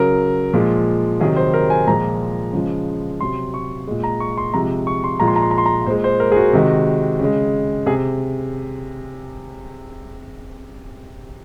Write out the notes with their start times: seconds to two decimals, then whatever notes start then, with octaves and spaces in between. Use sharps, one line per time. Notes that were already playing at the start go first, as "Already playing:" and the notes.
Already playing: C#3 F#3 A#4
0.53 A#2 F3 G#3
1.20 C3 D#3 F#3 G#4
1.36 C5
1.54 A#4
1.70 G#5
1.87 A#2 F3 G#3 A#5
2.53 C#3 F3 G#3
3.20 C3 F#3 C6
3.54 C#6
3.87 A#2 G#3
4.04 A#5
4.20 C#6
4.37 C6
4.54 C3 F3 G#3 A#5
4.87 C#6
5.04 C6
5.20 A#2 F3 G#3 A#5
5.28 C6
5.36 A#5
5.42 C6
5.51 A#5
5.58 C6
5.66 A#5
5.86 A#2 G#3 C5
6.04 C5
6.20 A#4
6.32 G#4
6.36 F#4
6.53 C3 D#3 G#3
7.19 C#3 G#3
7.86 C3 G#4